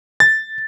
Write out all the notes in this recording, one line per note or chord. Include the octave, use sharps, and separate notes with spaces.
A6